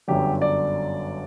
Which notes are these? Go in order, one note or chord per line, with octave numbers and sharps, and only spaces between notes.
G1 F#2 D3 F#3 G4
D5